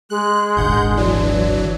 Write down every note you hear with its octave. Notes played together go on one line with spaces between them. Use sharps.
G#3 F#6
D#1 G#1 D3 F#5 G6
E3 F#3 D4